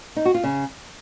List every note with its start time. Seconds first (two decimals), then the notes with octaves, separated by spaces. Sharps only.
0.16 D#4
0.25 F#4
0.34 F4
0.43 C#3